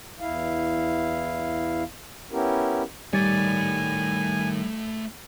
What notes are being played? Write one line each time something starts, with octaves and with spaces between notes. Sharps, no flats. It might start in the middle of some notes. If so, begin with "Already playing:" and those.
E2 E4 F5
B3 C#4 E4 G4 A#4
D#3 G3 A3 C#5 D5 G#5